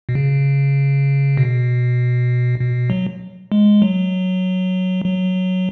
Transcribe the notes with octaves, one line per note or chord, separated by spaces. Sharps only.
B2
C#3
B2
B2
F#3
G#3
F#3
F#3